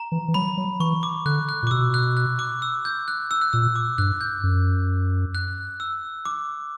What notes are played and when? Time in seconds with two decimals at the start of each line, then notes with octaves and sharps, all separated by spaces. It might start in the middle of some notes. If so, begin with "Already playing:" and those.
Already playing: A#5
0.12 E3
0.28 E3
0.34 F#3 B5
0.57 F#3
0.80 E3 C#6
1.03 D6
1.25 D3 F#6
1.49 F#6
1.63 A#2
1.67 D6
1.71 B2 E6
1.94 F#6
2.17 F#6
2.39 D6
2.62 E6
2.85 G6
3.08 F#6
3.31 E6
3.42 F#6
3.53 A#2 E6
3.76 D6
3.98 G2 F#6
4.21 G6
4.43 F#2
5.35 F#6
5.80 E6
6.25 D6